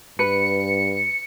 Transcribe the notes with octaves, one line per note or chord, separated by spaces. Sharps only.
G2 B4 C#7